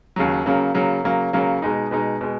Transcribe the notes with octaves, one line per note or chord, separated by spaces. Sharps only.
D#2 C#3 F#3
C#3 F#3 A#3
C#3 F#3 A#3
C#3 F#3 A#3
C#3 F#3 A#3
B2 G#3 D#4
B2 G#3 D#4
B2 G#3